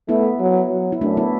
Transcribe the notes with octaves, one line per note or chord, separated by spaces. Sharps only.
A3 B3 E4
F#3
F#3
E4
F#2 A3 D4
B3 E4